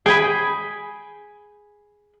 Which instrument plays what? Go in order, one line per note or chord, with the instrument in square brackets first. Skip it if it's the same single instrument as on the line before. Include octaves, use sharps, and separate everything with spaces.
[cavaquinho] G#4 B5 [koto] G5 G#5